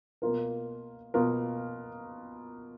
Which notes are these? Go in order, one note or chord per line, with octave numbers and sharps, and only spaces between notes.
B2 A#3 F4 A#4
B2 A#3 F4 A#4